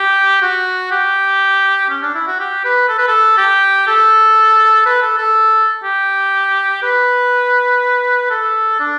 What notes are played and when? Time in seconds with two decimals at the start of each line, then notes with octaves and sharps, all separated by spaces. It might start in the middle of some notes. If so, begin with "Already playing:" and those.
Already playing: G4
0.42 F#4
0.92 G4
1.90 C#4
2.02 D4
2.15 E4
2.27 F#4
2.39 G4
2.64 B4
2.88 A4
2.98 B4
3.07 A4
3.38 G4
3.87 A4
4.86 B4
5.02 A4
5.18 A4
5.84 G4
6.82 B4
8.30 A4
8.80 D4